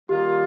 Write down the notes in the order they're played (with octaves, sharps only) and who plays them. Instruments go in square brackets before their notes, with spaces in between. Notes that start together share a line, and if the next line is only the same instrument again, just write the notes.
[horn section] D#3 G3 A#3 F4 [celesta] G4